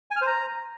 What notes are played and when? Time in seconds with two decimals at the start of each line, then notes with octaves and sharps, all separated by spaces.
0.11 G#5
0.16 F6
0.21 C5
0.27 A#5